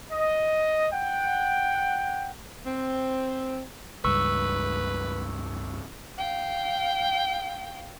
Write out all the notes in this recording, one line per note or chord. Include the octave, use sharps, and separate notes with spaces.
D#5
F#5 G5
C4
C#2 G2 B4 C#6 E6
F5 G5